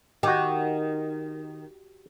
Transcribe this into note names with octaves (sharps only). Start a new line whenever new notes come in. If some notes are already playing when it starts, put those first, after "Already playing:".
D#3 F#4 G4